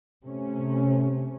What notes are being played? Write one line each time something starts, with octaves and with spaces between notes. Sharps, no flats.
C3 A3 C#4